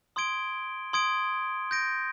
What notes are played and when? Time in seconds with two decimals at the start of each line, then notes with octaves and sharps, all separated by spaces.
0.16 C6 D#6 G#6 D7 G7
0.93 C6 D#6 G#6 D7 G7
1.71 G6 A#6 D7